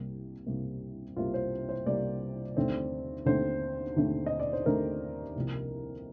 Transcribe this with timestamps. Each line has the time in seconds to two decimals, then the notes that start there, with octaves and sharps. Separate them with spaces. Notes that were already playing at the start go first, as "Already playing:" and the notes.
Already playing: C2 C3 G3 A#3 G4
0.46 C2 C3 G3 A#3
1.16 C2 C3 G3 A#3 F4
1.34 C5
1.69 C5
1.86 C2 C3 G3 A#3 D5
2.57 D#2 D3 A3 C4
3.26 D#2 D3 A3 C4 C5
3.96 D#2 D3 A3 C4
4.26 D#5
4.40 D5
4.53 C5
4.66 D#2 D3 A3 C4 A#4
5.36 C2 C3 F3 A#3